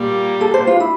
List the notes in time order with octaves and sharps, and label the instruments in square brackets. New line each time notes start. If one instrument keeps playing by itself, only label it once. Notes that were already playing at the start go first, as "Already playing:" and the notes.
Already playing: [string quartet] A#2 G3 A#3
[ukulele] A4
C5
F4
E4